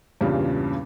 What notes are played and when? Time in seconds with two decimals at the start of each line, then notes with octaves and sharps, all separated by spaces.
0.21 E2 G2 A#2 C#3 G3